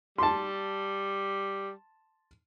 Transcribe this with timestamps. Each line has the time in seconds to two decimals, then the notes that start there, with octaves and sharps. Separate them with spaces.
0.18 G3 A5 C6